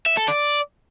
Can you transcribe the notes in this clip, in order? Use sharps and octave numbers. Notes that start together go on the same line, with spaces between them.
E5
A4
D5